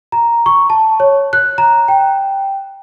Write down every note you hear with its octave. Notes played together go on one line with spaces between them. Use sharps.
A#5
C#6
A5
C#5
F#6
A#5
G5